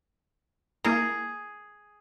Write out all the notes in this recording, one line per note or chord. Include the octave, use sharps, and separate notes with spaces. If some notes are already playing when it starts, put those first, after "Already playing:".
A#3 E4 G#4 A#4